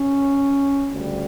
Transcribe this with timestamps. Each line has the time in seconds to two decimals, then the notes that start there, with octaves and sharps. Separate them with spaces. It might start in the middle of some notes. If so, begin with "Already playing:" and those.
Already playing: C#4
0.92 D2 C#3 G3